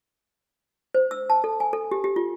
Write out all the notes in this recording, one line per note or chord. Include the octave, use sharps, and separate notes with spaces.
C5
E6
A5
A4
G#5
A4
G4
G4
F4